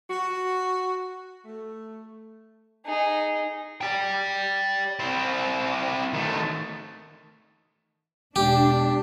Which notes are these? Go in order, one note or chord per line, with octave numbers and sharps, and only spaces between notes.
F#4
A3
D#4 G#4
D5 G5
C4 E4
D#3 A3
E1 D4 G4